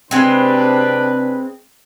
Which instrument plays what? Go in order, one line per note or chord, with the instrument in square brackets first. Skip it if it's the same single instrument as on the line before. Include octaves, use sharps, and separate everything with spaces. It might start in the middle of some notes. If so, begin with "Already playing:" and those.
[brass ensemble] C3 D4 B4 [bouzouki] G#3 C4